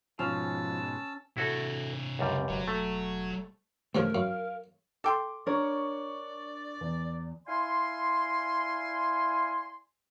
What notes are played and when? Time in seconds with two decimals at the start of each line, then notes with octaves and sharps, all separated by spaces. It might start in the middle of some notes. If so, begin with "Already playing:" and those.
0.19 G#2 B2 F3 C#4 A5 E6
1.37 A2 C3 E4 F#4 A4 C#5
2.19 C#2 F#2 G3
2.49 E1 F#3
2.68 A3
3.95 G2 C#3 F3 A3 A#4
4.15 F#2 F5
5.04 A4 G5 C6 D6
5.47 D4 A#4 C#5 D5 C#6
6.81 E2
7.48 E4 D5 F5 G#5 C6